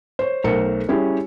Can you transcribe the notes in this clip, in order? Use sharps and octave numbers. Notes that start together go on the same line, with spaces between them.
C5 C#5
B1 A3 A4 A#4 C5 C#7
G3 C#4 E4 G4 G#4